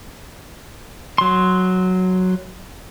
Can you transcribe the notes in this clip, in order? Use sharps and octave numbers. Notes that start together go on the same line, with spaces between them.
F#3 C6